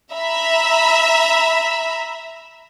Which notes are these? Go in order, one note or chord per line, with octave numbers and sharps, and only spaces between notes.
E5 A#5 B5